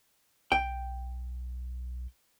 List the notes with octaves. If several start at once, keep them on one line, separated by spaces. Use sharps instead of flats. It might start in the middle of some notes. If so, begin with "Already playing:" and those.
B1 G5